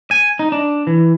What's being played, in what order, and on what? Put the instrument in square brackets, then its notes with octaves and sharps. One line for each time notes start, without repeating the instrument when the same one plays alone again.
[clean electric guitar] G#5
D#4
D4
E3